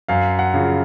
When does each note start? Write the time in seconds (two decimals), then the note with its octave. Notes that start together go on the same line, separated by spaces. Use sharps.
0.08 F#2 F5
0.39 F#5
0.54 C#3 F3